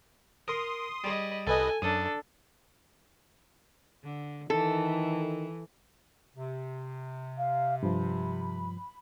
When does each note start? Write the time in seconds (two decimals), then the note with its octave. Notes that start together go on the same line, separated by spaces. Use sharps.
0.48 A#4 C6 D#6
1.04 G3 G#4 D#5 B5
1.47 C2 A4 B4 D#5 G#5
1.82 F#2 D4 A4 D#6
4.04 D3
4.50 D#3 E3 A4
6.36 C3
7.37 F5
7.83 G2 F3 B5